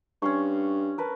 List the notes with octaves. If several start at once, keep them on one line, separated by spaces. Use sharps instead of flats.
G2 C#4 C6 C#6
A#4 B4 A5